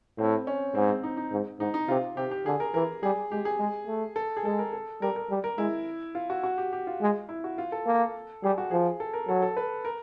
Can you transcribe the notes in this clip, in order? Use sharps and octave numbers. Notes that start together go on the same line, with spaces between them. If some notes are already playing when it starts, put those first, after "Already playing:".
A2 C4
C#4
G#2 C4
C4
D#4
D#4
G#2
G#2 D#4
D#4
C3 F4
C3 G4
G4
D3 G#4
A#4
E3 A#4
G3 G#4
G#3 G4
G#4
G#3
A3
A4
G#4
G#3 A4
A#4
A4
G3 A#4
A#4
G3
A#4
G#3 E4
F4
F#4
F#4
G4
G4
F4
G#3
E4
F#4
F4
A4
A#3
G3 G#4
F#4
F3 G#4
A4
A#4
F#3 A4
A4
B4
A#4